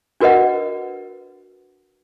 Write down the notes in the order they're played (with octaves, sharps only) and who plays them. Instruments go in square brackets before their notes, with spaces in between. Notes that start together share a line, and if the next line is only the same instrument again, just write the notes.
[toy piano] D4 F#4 A#4 B4 D#5 F#5